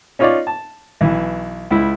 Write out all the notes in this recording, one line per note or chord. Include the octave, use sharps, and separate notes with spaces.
C#4 D#4 F4 C#5 D5
A5
B1 E3
C#2 E4